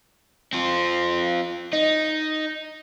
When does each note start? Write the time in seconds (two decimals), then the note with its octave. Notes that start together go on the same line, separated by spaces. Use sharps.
0.53 C4 F4
1.73 D#4